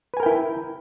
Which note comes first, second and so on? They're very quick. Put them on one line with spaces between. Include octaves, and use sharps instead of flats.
B4 G#5 A#4 G5 E4